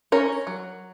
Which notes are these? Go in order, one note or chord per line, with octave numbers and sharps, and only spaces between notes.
C#4 A#4 C#5
F#3